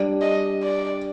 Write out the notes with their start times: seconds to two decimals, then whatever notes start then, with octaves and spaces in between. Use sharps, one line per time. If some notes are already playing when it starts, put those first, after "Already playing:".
Already playing: G3 D4 G4
0.21 D#5
0.63 D5